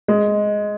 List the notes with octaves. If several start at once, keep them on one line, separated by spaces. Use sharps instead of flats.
G#3